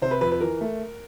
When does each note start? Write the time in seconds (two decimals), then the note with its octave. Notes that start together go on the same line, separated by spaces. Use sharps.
0.02 C3 C5
0.11 B4
0.21 F2 B4
0.31 B4
0.41 E3 A#4
0.61 A3